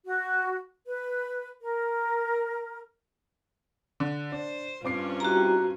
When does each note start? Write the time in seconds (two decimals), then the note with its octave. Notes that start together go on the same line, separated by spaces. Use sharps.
0.05 F#4
0.86 B4
1.61 A#4
4.00 D3
4.32 D4 C5
4.84 G2 C4 C#4 F4 D6 C7
5.20 G3 E4 F#4 G4 A#5